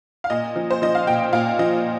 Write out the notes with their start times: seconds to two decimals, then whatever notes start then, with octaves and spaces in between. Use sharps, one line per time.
0.24 F5
0.30 A#2 D#5
0.56 F3
0.71 C5
0.82 F3 D#5
0.95 F5
1.07 A#2 G5
1.33 A#2 F5
1.59 F3 D#5